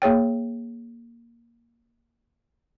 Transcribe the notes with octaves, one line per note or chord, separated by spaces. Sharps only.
A#3 G#4 C#5 G5